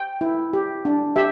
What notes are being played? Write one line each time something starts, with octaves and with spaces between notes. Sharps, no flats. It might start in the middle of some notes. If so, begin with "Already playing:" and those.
Already playing: G5
E4
G4
D4
G4 E5